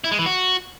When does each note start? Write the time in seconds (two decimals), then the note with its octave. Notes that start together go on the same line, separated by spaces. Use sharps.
0.04 E4
0.11 G#3
0.19 E3
0.26 F#4